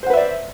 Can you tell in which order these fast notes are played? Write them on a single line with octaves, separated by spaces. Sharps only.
C5 F#5 B4 E5 D5